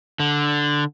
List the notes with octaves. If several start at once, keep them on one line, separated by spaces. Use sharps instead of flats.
D3